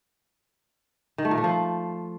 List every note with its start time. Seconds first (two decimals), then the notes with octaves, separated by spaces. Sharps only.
1.18 D#3
1.25 A3
1.31 A#2
1.38 A3
1.44 F3